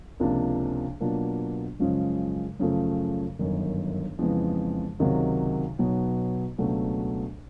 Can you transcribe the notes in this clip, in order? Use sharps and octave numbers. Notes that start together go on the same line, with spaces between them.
C#2 C3 F3 A#3 D4
B2 F#3 A#3 D4 F4
F#2 C#3 F3 G#3 C#4
F#2 C#3 F3 A3
G1 F#2 D#3
F2 C#3 E3 G#3 B3
C#2 C3 D#3 F#3
B1 B2 F#3 B3
C#2 B2 F#3 A3 D4